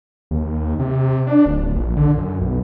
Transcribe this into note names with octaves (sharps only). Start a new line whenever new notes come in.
D#2
C3
D4
D1
A#1
D3
F#2
B1